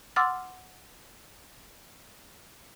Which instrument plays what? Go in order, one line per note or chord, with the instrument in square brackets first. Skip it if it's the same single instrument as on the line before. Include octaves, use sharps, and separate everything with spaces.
[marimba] F#5 C6 D6 E6 F6 A6